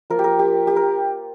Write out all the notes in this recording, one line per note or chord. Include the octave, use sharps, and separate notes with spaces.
F3 A#3 F4 A#4
G4
A#4
G4
G4
A#4